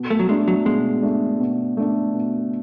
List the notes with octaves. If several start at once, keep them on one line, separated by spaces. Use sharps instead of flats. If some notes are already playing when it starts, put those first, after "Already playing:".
Already playing: B2
A3
F#3
G#3 A3 D4
F#3
B2 G#3
A3 D4
B2
A3 D4
B2